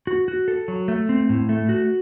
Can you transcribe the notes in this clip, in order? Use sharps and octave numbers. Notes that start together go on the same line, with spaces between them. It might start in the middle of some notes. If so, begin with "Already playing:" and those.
F#4
F#4
A4
F#3
A3
C4
A2
A3
F#4